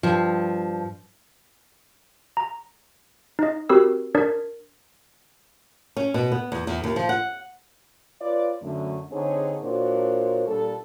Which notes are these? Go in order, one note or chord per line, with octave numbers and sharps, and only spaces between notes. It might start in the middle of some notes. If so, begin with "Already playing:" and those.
G2 F3
A#5
D#4 D#5
C4 F#4 G4 A#4 B5 E6
D4 A#4 D5
C#4
B2
B3
E2
E2
D#2
F3
F#5
F4 B4 C#5 D5
F#2 D3 A3
D3 C4 D#4 G#4 C#5
A#2 D4 F#4 A#4 C5 C#5
A#2 G3 D4 A4